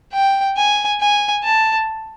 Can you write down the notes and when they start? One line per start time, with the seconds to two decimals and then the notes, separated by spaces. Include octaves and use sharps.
0.13 G5
0.57 G#5
1.00 G#5
1.43 A5